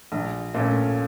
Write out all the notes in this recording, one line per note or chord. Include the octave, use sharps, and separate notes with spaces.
A#1
A#2 A3 C#4